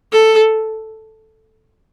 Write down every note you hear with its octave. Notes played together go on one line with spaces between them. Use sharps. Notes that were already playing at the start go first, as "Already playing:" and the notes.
A4